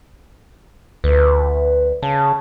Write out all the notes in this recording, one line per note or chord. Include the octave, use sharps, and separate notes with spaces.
D2 B4
C#3 A5